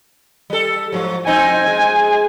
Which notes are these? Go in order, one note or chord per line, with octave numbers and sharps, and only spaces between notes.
G3 A4
G#2 F3 F#3
F2 C4 D#4 G#5
G#3